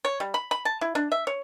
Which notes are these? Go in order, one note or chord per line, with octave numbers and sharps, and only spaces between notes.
C#5
G3
B5
B5
A5
E4
D4
E5
C#5